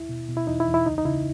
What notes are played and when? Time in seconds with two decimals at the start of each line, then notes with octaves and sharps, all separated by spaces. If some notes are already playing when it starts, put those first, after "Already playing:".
Already playing: D#2 E4
0.09 B2
0.29 B2
0.37 E4
0.47 E2 D#4
0.60 E4
0.67 E2
0.74 E4
0.86 C#2 D#4
0.98 D#4
1.05 C#3 E4